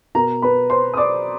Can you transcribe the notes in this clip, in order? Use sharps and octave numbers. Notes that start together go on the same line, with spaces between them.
B2 A#4 A#5
B4 B5
C5 C6
D#6
D5 D6